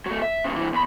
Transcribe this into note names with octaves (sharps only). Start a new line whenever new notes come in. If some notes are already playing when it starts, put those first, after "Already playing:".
F#3 A3
E5
G2 C#3
G2 E3
E2 B5